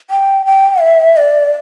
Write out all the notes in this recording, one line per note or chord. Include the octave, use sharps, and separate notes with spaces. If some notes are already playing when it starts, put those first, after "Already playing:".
G5
G5
E5
D5